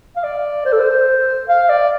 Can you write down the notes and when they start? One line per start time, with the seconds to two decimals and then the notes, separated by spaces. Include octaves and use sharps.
0.16 F5
0.24 D5
0.65 C5
0.72 A4
0.80 C5
1.49 F5
1.69 D5